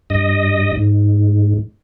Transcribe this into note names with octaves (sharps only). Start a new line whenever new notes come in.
G2 D#5
G#2